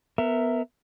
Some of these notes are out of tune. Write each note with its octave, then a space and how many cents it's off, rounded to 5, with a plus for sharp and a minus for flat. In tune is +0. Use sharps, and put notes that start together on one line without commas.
B3 +5 A#4 -15 E5 +0